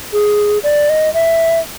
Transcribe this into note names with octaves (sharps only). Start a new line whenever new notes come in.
G#4
D5
D#5
E5